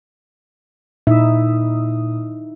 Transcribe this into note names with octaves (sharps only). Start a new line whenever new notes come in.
A#2 D#4 E4 E5 D#6